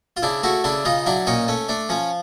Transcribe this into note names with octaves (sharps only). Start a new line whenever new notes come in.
F4
C#3 D4 E4
A3 E4 F#4
C#3 D4 E4
C#3 D#4 F4
F#3 D4 E4
A#2 C#4 D#4
A3 C#4
A3 D4
F3 C#4